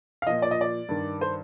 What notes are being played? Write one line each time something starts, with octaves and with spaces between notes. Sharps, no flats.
F5
A#2 F3 D#5
D5
D#5
D5
G2 D#3
C5